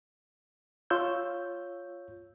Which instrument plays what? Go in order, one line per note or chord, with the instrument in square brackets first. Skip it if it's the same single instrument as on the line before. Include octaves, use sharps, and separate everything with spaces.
[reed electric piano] F4 C#5 E6 G6